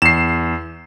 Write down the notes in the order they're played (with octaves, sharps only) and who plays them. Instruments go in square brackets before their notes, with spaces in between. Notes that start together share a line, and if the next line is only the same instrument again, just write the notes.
[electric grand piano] E2 [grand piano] C7 E7